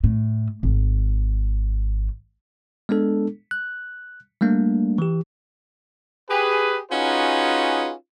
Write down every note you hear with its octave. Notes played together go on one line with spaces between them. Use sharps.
A2
G#1
G#3 B3 D4 A4
F#6
G3 A3 A#3 D4
E3 G4
G4 G#4 B4
C#4 D#4 F4 F#4 G#4 B4